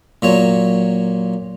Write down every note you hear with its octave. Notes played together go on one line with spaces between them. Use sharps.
A#2 F#3 C#5